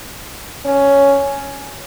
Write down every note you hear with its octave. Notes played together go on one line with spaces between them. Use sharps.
C#4